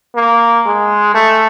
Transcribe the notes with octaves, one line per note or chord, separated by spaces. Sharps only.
A#3
G#3
A3